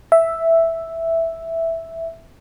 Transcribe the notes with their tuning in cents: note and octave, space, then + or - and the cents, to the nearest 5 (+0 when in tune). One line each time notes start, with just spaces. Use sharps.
E5 +0